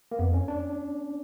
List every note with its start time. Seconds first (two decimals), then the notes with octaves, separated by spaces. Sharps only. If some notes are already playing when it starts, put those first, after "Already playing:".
0.11 A#3
0.19 F2 B3
0.34 C#4
0.48 D4